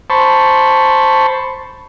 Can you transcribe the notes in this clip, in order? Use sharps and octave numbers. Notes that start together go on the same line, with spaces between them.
C5 A5 B5 C#6